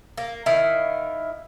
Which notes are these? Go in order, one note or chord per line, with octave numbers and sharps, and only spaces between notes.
A#3
D#3 E4 F5